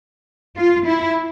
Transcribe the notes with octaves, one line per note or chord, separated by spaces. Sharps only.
F4
E4